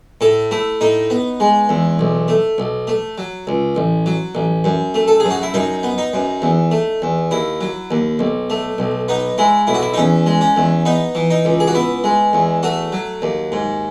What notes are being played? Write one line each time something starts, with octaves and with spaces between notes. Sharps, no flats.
A2 A4
A3 E4
A2 D#4
B3
G#3
E2
B1
A3
B1
A3
F#3
C#2
A1
F#3
A1
F#2
A3
A4
F#2 G#4
F#4
E4
F#2 D#4
B3
D#4
F#2
E2
A3
E2
D#2 E4
F#3
D#2
B1
A3
B1
B3 D#4
G#3 E4
B1 E4
F#4
E4
D#4
E2 C#4
G#3
C#4
E2
B3 D#4
E3
D#4
C#2
G#4
F#4
B3 E4
G#3
E2
A3 F#4
F#3
D#2
G#2